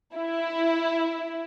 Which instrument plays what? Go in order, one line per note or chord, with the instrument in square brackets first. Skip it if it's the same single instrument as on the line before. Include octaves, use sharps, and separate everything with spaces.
[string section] E4